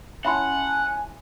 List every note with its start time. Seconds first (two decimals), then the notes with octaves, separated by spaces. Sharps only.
0.25 C#4 E4 E5 F#5 G#5 A5 B5 C6